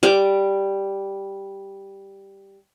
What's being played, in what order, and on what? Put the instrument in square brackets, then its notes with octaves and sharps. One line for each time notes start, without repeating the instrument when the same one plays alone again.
[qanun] G3 D6